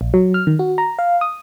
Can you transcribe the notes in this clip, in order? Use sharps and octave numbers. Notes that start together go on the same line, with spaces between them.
A#1
F#3
F6
D#3
F#4
A#5
F5
D#6